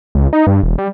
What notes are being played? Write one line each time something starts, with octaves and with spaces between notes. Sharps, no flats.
C#2
D#4
G2
E1
G3